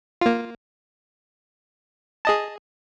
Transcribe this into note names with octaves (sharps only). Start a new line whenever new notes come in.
A#3 F4
G#4 D#5 A5